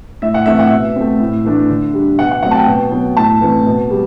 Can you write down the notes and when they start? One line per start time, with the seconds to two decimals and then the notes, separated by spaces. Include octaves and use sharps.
0.22 A2 E5
0.34 F#5
0.46 E3 A3 C4 E5
0.59 F#5
0.70 B2 E5
0.96 A3 C4
1.20 A2
1.45 E3 A3 D4
1.69 D3
1.94 G3 D4
2.19 B2 F#5
2.31 F#5
2.42 F#3 A3 C4 F#5
2.51 A5
2.55 G5
2.67 B2
2.91 F#3 B3
3.17 A2 A5
3.41 E3 A3 C4
3.66 B2
3.90 G3